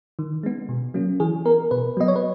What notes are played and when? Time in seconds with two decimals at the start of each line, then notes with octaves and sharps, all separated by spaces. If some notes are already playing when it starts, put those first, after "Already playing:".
0.19 D#3
0.43 G#3 B3
0.69 B2
0.94 F#3 A#3 C#4
1.20 E3 G#4
1.45 B3 A#4
1.71 B2 B4
1.97 F#3 B3 D#5
2.08 C#5
2.16 B4